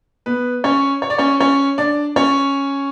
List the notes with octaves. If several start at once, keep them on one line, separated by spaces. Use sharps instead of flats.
B3 B4
C#4 C#5
C#5
D5
C#4 C#5
C#4 C#5
D4 D5
C#4 C#5